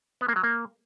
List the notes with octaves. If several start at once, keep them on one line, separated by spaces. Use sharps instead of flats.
B3
A#3
F#3
A#3